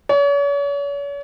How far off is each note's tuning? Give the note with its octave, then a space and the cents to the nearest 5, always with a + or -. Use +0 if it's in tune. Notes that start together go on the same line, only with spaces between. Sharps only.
C#5 +40